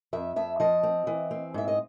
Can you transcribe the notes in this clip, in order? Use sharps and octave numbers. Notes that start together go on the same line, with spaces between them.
F2 E5
F2 E5
F3 D#5
C4
E3
C4
G#2 E5
D#5